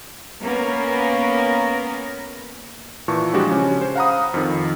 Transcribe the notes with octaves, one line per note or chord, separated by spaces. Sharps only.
A#3 B3 C#4 A#4
A#2 E3 A5 C#6
F3 G3 G#3 D4 F#4 G4
C#3 C#4
C5
F5 F#5 A#5 B5 D#6
F2 D#3